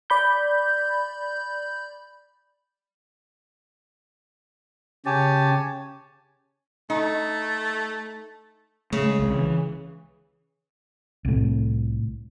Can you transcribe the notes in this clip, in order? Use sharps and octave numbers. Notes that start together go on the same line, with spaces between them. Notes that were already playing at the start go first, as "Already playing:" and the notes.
D5 B5 G6
C#3 G4 C#5 G#5 A5
A3 D#4
C#3 A3
G#3
C2 C3 G#3
E3
C2 A2